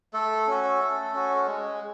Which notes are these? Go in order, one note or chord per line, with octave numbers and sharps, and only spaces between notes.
A3 A4
C#4 F#4
A3
C#4 F#4
G#3